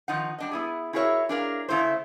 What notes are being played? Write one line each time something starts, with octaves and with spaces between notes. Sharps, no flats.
D#3 F3 D#4 F#5
G3 D4 D#5
B3 E4 G#4
E4 F#4 G#4 A#4 C#5 E5
D4 G#4 A#4 F5
C#3 A3 E4 C5